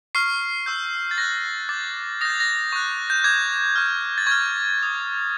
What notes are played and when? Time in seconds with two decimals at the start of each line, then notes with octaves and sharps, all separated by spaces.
0.15 C#6 F6 C7
0.66 C#6 E6 G6
1.11 A6
1.18 C#6 F#6 A#6
1.69 D6 G6 A6
2.21 D#6 G6 A#6
2.30 A6
2.40 A#6
2.72 C#6 F#6
3.10 G6
3.24 D6 G6 G#6
3.76 C#6 F6
4.18 A6
4.27 C#6 F6 G#6
4.79 D#6 G6